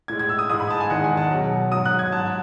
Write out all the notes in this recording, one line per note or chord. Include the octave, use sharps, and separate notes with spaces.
A2 G#3 G#6
G#6
E6
D#6
G#2 E3 G#3 D#6
B5
A5
G#5
E2 D#3 G#3 F#5
G#5
A5
B2 F#3
G#2 F#3 D#6
F#6
G#6
G#2 F#3 A5